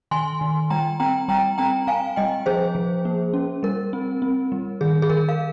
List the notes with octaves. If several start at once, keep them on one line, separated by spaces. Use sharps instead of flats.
D#3 G#5 C6
D#3
G3 G5 A#5
C4 G5 A#5
G3 G5 A#5
C4 G5 A#5
C4 F5 G#5
G3 D#5 G5
F3 G#4 C5
F3
A#3
C#4
G3 A#4
C4
C4
G3
D#3 G#4
G#4
D#3 A#4
F5